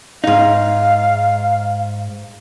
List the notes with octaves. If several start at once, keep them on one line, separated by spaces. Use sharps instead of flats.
G#2 D#4 F5